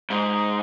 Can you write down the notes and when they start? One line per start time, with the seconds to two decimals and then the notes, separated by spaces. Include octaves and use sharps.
0.10 G#2